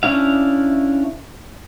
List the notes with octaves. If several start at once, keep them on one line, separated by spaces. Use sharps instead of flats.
C#4 D4 E4 F5